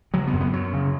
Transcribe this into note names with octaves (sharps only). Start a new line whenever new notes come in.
C#3 F#3
B3
F#2
B3
F#2 F#3
C#3